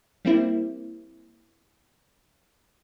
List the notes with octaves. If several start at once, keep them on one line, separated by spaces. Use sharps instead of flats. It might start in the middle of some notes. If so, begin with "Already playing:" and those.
G3 A#3 C4 E4